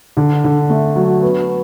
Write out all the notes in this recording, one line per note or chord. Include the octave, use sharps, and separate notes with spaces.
D3
D3
A3
F#3
B3